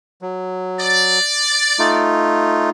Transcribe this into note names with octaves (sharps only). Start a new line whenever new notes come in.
F#3
D5
A3 D#4 F4